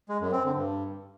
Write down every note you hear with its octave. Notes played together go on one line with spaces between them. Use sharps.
G#3
F#2
C4
D3
G2